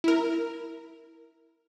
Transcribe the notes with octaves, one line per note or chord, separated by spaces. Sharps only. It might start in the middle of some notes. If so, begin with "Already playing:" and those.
E4 A#4